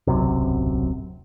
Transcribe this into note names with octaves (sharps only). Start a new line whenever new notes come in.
D1 B1 F#2 C3